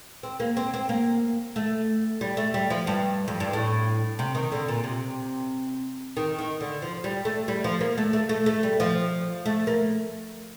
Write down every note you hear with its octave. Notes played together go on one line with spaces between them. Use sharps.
C4
A#3
C4
C4
A#3
A3
G3
A3
G3
F3
G2
F2
G2
A2
C3
D#3
D3
A#2
C3
D#3
D#3
D3
F3
G3
A3
G3
F3
A#3
A3
A3
A3
A3
G3
F3
A3
A#3